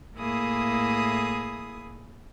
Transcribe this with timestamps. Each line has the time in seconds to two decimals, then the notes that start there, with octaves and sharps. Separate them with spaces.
0.16 A2 A#3 E4 G#4 D#6